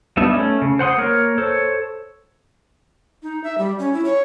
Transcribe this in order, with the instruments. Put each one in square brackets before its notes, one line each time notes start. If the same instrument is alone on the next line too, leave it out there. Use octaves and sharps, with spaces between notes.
[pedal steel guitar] G3 B3 D4 D#4 E5
A3 C#4
C#3
C5 F#5 C6 D#6
A#3 A#4 C#5
A4 C5 C#5
[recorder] D#4
E5
G3
C#4
E4
C#5